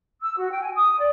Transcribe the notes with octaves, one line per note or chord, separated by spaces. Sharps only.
E6
F#4
G5
G#5
D#6
D5